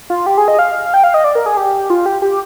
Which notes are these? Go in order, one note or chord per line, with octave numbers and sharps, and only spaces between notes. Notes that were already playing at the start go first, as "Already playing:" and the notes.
F4
G4
G#4
D#5
F5
G5
F5
D#5
D5
A#4
G#4
G4
F4
G4
G4